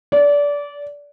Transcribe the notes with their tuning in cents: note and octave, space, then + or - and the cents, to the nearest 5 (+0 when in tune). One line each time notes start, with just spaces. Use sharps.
D5 -25